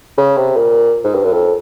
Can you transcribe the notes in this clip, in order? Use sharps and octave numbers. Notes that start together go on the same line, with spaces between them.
C#3
C3
A#2
G#2
G2
F#2
F2